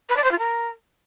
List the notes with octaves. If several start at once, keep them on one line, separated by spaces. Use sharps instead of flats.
B4
D5
C5
F4
A#4